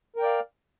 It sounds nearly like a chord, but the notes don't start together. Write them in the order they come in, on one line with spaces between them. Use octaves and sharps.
A#4 G5 D5 F5